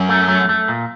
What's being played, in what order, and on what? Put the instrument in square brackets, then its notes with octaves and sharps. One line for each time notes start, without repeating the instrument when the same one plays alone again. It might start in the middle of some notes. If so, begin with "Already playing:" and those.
Already playing: [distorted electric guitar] F#2
[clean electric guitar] A3
A3
A3
A#2